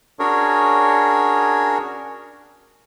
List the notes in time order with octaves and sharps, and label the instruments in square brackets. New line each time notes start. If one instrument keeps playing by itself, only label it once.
[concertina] C#4 D4 F#4 G#4 A#4 C#5